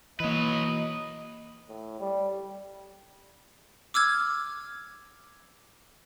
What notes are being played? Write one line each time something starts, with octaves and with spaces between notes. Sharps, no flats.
E3 F#3 A#3 B4 D#5
A2
G3
D6 E6 F6 G#6